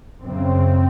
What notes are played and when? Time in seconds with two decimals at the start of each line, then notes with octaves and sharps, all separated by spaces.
0.24 F#2 C#3 C4